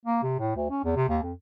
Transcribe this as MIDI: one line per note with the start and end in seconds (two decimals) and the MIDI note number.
0.05 0.21 58
0.23 0.38 48
0.39 0.51 45
0.56 0.67 38
0.70 0.80 61
0.84 0.93 40
0.96 1.07 48
1.09 1.18 39
1.22 1.33 41